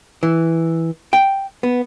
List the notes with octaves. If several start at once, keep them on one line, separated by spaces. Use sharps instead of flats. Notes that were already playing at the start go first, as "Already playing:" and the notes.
E3
G5
B3